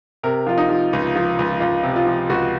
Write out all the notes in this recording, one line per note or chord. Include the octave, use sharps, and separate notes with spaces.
C3 A#4
F3 F4
D#4
F3
C#2
F3
C#2
C#2 F4
C3
F4
F3
C#2 F#4